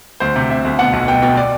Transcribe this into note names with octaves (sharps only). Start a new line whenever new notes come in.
D2 C5
C3
C3 E5
D2
B2 F#5
B1
B2 G5
B2 G5
D5